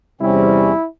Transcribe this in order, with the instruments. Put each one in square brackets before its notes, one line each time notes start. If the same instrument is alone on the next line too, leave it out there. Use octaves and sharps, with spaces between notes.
[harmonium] E2 C4 C#4 [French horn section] C3 G3 [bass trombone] E4